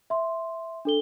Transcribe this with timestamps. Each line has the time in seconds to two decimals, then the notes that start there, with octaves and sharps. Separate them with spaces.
0.10 E5 C6
0.85 D4 A4 G7